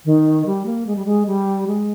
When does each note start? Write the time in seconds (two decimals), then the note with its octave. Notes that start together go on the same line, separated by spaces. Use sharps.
0.05 D#3
0.46 G3
0.66 A#3
0.87 G#3
0.96 G3
1.06 G#3
1.26 G3
1.67 G#3